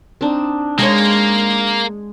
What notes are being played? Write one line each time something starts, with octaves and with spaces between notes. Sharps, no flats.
C4 D4 D#4
G#3 A#3 C#5